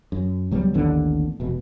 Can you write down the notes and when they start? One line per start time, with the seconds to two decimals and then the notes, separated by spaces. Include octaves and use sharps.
0.12 F#2
0.51 C#2 F#3 G3 B3
0.74 A1 D#2 D3 B3
1.40 F1 B2